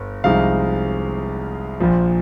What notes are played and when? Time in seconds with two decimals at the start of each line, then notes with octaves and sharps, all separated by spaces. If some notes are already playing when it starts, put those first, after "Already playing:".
Already playing: G1
0.24 C2 C3 F3 G#3 D#4 F5
1.80 A#1 A#2 F3